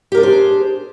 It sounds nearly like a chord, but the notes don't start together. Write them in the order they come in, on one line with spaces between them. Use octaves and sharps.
G4 A#4 D4 G#4 C5